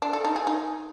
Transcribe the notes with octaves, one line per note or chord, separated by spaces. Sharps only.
D4
A4
D#4
G#4
D#4